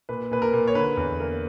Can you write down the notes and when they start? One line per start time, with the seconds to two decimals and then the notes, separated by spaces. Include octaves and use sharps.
0.09 A#2 B4
0.31 A#2 B4
0.42 A#4
0.53 A#2
0.67 C#5
0.75 D3 B4
0.97 E2
1.20 A#3